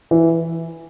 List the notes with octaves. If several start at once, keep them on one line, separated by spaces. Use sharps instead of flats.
E3